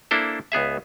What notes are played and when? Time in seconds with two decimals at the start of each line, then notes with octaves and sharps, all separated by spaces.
0.11 A#3 D4 E4 A4 C5
0.52 C#2 B3 G#4 E5